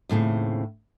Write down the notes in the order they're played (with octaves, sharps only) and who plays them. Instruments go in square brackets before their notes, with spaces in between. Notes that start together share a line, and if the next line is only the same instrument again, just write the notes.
[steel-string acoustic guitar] D#2 A2 C#3 C4